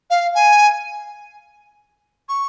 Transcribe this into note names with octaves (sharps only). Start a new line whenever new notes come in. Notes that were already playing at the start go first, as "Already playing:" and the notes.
F5
G#5
C#6